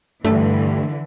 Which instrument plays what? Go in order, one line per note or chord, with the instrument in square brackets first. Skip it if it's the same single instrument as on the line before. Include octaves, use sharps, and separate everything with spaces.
[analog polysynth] G2 [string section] D3 E3 [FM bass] A3